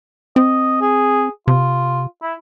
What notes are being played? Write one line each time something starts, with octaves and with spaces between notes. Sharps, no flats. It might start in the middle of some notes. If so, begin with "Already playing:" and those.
C4 D#5
G#4
C3 F4
E4